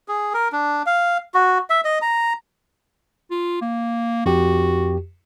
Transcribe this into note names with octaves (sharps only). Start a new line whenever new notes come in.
G#4
A#4
D4
F5
F#4
E5
D#5
A#5
F4
A#3
F2 F#4 G4